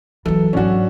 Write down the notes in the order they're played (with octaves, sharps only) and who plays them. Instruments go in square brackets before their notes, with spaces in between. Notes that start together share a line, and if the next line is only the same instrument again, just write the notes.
[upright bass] E3 F#3 [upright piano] A4
[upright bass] G#2 F#3 [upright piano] C#4 D4 F#4